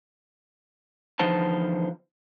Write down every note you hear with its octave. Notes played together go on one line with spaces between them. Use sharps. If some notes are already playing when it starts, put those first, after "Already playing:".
E2 D3 F3 D#4 C5 A5